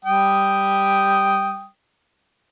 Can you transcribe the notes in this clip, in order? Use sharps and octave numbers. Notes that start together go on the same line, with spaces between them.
G3 G5 D#6